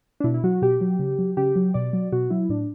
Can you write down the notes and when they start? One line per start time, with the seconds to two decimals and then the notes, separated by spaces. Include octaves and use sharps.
0.20 D4
0.24 B2 E4
0.34 E4
0.44 F#3 F#4
0.62 B2 G4
0.81 F#3
0.99 C#3
1.19 F#3
1.37 C#3 G4
1.56 F#3
1.74 B2 D5
1.93 F#3
2.12 B2 F#4
2.30 F#3 E4
2.49 A2 D4